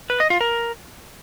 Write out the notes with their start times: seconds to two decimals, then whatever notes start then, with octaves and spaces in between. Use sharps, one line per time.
0.10 B4
0.20 D#5
0.30 F4
0.41 A#4